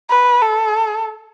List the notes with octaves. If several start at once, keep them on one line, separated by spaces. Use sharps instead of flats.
B4
A4